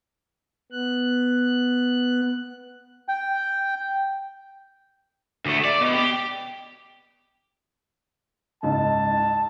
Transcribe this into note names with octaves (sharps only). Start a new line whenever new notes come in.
B3 F#6
G5
D2 A3
D5
B2
G4
F#1 C#2 G#2 A5